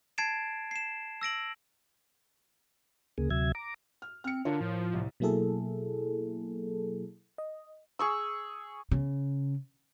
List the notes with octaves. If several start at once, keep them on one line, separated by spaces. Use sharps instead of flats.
A5 G#6 A6 C7 D7 E7
C7 E7
E6 A#6 D7 F#7
D2 C#3 A#3 G#4
D2 C3 F#3 E5 G#6
A#5 D6
F6
C4 F6 C#7
D3 D4 F4 A#4 C#5
A2 F3
C2
B2 F#3 A#3 E4 G#4 A4
D#5
G#4 C#6 E6
C#3